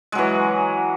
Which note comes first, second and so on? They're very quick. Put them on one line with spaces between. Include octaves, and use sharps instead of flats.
G#3 F#3 E3